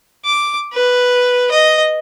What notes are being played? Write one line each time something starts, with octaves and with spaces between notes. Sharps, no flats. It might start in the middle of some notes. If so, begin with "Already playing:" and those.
D6
B4
D#5